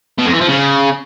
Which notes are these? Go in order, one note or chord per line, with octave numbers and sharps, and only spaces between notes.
B2
F2
E3
F3
C#3